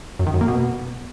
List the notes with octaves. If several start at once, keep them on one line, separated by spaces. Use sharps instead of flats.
F#2
D#3
F#2
A#3
B2